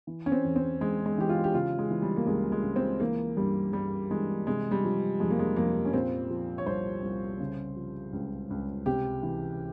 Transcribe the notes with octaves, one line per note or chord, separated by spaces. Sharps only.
E3
C#4
C4
E2
C4
E2 G#3
G#3
E3 G4
F4
G4
C#3 F4
G#3
E3
G3
A#3
C#2 G#3
G#3
C#2
C4
E3 A#3
G2 G3
G2 G3
E3 G#3
C3 G#3
G3
F3
F2 G#3
A#3
G#3
F2 A#3
C#4
A#2 C4
F3
C#5
C2 C5
C2
C#3
F3
C#2
C#2
C3 G4
E3